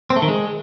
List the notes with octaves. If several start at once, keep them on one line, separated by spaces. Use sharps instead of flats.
C4
A3
D#3
G#3